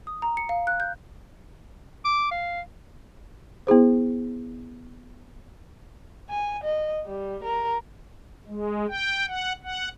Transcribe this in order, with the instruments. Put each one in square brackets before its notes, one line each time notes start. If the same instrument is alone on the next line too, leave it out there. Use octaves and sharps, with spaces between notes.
[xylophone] D#6
A#5
C#7
F5
F#6
G6
[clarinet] D6
F5
[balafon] B3 E4 G#4 C5
[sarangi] G#5
D#5
G3
A#4
[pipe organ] G#3
G5
F#5
F#5